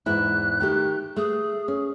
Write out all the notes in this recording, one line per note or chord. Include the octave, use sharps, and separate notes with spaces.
E2 G#2 E4 F#6
D#3 A3 G4
A3 G#4
C#4